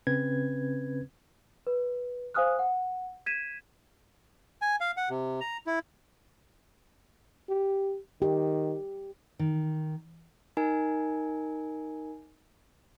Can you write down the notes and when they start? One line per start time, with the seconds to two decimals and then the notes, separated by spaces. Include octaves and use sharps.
0.07 C#3 C4 C#4 B4 G#6
1.67 B4
2.34 C5 F5 G#5 D#6 F6 F#6
2.59 F#5
3.26 G#6 B6 D#7 E7
4.62 G#5
4.80 F5
4.97 F#5
5.10 C3
5.40 A#5
5.67 E4
7.49 G4
8.22 D#3 G4
9.39 D#3
10.57 D#4 A#4 G#5